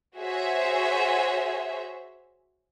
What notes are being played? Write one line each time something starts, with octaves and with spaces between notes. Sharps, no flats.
F#4 G#4 C5 C#5 E5